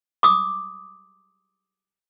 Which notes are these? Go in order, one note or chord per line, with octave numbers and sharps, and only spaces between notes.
D6 D#6